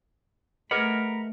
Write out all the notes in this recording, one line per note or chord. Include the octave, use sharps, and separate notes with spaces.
A3 G#4 A#4 B4 D#5 F#5 A#5 B5